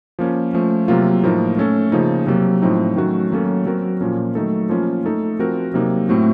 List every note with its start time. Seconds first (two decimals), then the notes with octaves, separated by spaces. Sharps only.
0.19 F3 A#3 C#4
0.53 F3 A3 C#4
0.88 C3 F#3 A#3 F4
1.23 A2 F3 A#3 D#4 A#4
1.57 A3 C#4 A4
1.92 C#3 F3 A#3 D#4
2.27 C3 F#3 A#3
2.62 A2 F3 C4 D#4
2.96 D#3 F#3 A3 C#4 F#4
3.31 D#3 F#3 A#3 C#4 A4
3.66 F#3 C4 F#4 A#4
4.01 A#2 F3 A#3 C#4
4.35 D#3 F#3 A3 D#4 A4
4.69 F3 A#3 C#4 F4
5.05 A3 D#4 A4
5.39 F3 C4 F#4 A#4
5.74 C3 F#3 A#3 D#4
6.09 A2 A3 C4 F#4